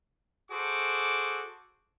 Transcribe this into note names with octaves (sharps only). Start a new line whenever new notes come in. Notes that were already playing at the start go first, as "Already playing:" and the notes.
F#4 G#4 A4 C5 D6